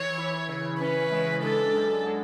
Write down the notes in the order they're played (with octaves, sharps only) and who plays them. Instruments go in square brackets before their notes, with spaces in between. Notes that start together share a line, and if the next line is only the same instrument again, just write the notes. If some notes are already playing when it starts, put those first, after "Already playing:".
Already playing: [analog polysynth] E3 [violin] C#5
[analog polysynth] E4
C#3
[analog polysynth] C#4 [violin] B4
[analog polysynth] G#3
[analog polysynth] D4 [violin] A4
[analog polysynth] F#2
G#3